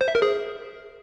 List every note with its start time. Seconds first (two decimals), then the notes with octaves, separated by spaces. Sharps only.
0.01 C5
0.08 E5
0.15 A#4
0.22 G#4